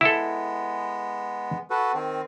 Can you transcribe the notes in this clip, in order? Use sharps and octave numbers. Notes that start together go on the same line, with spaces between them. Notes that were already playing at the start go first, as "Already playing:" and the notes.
G#3 B3 E4 A4
F#4 A4 B4
D#3 C4